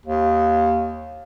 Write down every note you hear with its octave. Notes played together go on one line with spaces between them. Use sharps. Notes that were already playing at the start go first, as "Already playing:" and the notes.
D#2